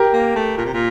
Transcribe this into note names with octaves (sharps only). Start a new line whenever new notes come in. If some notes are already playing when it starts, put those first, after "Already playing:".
Already playing: G4 A#4
A#3
A3
A#2
C3
A#2